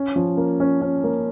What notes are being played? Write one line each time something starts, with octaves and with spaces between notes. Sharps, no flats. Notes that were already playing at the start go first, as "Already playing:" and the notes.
Already playing: C#4
F3
A#3
C#4
C#4
A#3